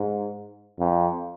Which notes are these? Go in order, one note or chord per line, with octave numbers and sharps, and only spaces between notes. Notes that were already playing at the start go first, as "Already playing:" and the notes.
Already playing: G#2
F2